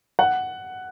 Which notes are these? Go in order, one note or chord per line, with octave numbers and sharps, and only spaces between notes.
F#5